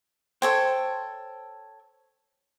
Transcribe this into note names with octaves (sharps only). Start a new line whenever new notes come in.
A4 C5 C#5 G5